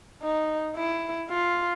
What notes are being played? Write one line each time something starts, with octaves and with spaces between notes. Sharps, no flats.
D#4
E4
F4